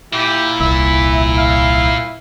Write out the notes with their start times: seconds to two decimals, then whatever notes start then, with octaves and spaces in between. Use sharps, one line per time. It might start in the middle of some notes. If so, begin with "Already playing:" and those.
0.13 A#2 E4 G4
0.60 D#1 C2 E5
1.38 F5